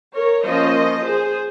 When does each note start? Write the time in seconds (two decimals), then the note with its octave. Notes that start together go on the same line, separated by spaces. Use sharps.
0.15 A#4 C#5
0.45 F3 A#3 C#4 C5 D#5
1.05 G#4 C5